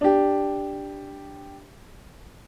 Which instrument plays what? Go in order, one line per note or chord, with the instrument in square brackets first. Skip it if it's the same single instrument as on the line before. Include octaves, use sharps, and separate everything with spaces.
[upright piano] D4 G4